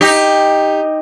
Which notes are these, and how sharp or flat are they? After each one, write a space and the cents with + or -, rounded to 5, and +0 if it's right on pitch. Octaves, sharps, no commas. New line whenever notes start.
D#4 +0 G4 +10